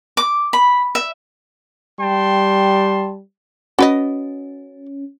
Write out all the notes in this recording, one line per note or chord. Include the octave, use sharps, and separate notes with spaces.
D6
B5
E5
G3 G5 A5 C6
C#4 F#4 B4 D#5